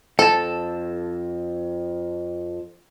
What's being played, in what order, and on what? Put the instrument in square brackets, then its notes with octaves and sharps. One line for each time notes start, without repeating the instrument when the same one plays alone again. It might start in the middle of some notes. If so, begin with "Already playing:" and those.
[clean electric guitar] F2 A5 [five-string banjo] A4